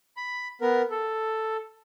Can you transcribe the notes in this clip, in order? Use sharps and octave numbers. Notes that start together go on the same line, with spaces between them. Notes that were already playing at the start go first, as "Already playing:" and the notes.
B5
B3 A#4
A4